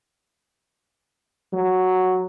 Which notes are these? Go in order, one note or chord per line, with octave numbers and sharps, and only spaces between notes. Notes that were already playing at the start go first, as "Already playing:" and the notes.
F#3